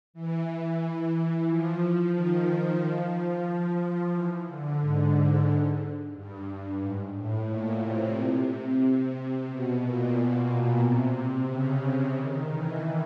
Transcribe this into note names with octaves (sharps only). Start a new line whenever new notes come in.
E3
F3
D#3
F3
E3
D3
G#2
G2
G#2
A2
A#2
C3
B2
A#2
B2
B2
C3
C#3
D#3
E3